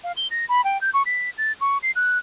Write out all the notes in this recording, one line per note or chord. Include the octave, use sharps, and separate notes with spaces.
F5
G7
A#6
B5
G5
G6
C#6
B6
A6
C#6
C7
F#6